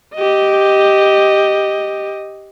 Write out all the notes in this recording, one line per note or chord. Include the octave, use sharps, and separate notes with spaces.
G4 D#5